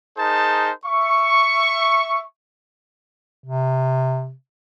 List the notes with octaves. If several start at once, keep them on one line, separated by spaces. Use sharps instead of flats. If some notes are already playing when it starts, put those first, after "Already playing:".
D#4 G#4 A#4 C5 A5
E5 C#6
C3